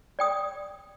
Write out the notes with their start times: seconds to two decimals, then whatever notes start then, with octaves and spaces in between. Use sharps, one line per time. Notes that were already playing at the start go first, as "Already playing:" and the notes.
0.19 D5 G5 D#6